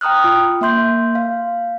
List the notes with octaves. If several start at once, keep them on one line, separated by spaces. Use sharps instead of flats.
G5 A#5 D#6 F6 F#6
F4
A#3 E5 C6 G6
F5